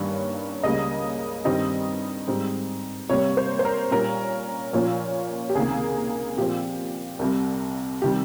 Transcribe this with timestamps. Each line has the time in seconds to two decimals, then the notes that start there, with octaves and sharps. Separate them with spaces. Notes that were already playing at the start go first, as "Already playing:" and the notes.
Already playing: G2 D#3 G3 A#3 C#4
0.63 C#2 C#3 G3 A#3 D#5
1.45 G2 D#3 G3 C4 D#5
2.27 G#2 G3 C4
3.09 C3 G3 A#3 C#5
3.37 C5
3.59 C5
3.65 A#4
3.91 A#2 G3 C#4 A#4
4.73 A#2 F3 A#3 C#4
5.49 G4
5.55 C#2 C3 D#3 A#3 G#4
6.37 A#2 F3 C4 G4
7.19 C2 C3 G3
8.02 C3 D#3 G3 G4